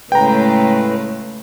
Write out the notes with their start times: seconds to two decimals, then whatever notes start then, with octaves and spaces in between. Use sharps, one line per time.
0.12 A2 C#3 G#3 A3 B4 G5 A#5